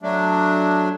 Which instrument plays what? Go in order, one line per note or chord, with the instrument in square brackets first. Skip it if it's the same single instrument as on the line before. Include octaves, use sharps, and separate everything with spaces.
[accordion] F#3 A3 D4